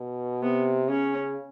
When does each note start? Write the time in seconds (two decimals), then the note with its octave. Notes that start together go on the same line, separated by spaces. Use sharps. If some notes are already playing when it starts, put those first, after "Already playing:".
Already playing: B2
0.42 C3 B3
0.89 C#3 C#4